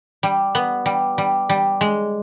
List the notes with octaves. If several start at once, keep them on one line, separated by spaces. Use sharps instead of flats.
G3
B3
G3
G3
G3
G#3